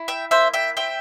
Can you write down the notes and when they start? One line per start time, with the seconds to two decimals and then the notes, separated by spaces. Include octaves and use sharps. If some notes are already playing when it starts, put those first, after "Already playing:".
Already playing: E4
0.08 E5 G5
0.31 A#3 C5 E5
0.54 E5 G5
0.77 C4 E5 G5